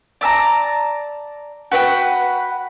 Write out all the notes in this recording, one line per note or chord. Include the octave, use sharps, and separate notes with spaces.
D5 E5 A5 A#5
F#4 B4 F#5 G5